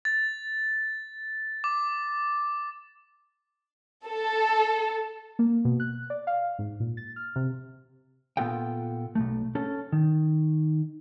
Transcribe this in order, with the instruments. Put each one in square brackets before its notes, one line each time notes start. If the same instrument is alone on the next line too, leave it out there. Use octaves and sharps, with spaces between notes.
[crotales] A6
D6
[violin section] A4
[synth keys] A#3
B2
F#6
D5
F5
G#2
A#2
A6
F6
C3
[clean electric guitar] A#2 B3 F4 A4 F5 G5
B1 F2 A3
C#4 A4
D#3